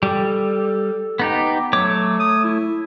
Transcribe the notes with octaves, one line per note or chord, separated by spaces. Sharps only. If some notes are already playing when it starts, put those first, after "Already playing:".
G3 A4
B3 D#4 G4
F#3 A3 C#5 D6
D#6
E4